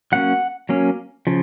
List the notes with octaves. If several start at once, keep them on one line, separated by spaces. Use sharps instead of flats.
F#3 A#3 C#4 F#5
F#3 A#3 C#4
C#3 F3